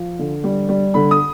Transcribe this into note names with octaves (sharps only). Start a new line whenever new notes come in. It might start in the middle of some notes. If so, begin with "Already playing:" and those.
Already playing: F3
D3
G3
G3
D3 B5
D#6